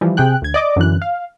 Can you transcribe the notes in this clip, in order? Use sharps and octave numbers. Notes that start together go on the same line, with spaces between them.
E3 F3 G3
C3 G#4 G5 F#6
D2 G#6
D5 D#5 D6
F#2 D3 E3 F#6
F5